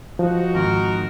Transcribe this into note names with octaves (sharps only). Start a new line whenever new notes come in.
F3 D#4 F#4
G#1 A#4